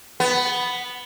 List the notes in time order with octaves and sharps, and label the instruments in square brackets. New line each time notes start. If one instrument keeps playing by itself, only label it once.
[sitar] B3